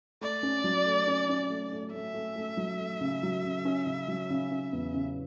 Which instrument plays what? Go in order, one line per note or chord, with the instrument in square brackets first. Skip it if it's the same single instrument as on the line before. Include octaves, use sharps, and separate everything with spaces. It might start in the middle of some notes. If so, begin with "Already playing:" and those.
[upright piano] A3 [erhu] D5
[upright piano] C#4
F#3
A3
C#4
C#4
A3
A3
[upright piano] A3 [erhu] E5
[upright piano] A3
A3
F#3
A3
C#3
F#3
C#3
C#4
C#3
F#3
C#3
C#4
E2
C#3